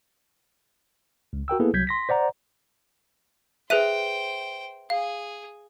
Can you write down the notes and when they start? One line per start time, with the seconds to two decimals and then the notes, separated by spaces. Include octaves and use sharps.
1.33 C#2
1.48 F#4 A#4 G5 E6
1.60 A#3 B3 E4 G#4 A4 B4
1.73 C2 F#3 G6 G#6 B6
1.87 C6 A#6 B6
2.09 C5 D5 F#5 A#5
3.70 G#4 B4 C5 E5 G5 F#6 D#7
4.90 G#4 F5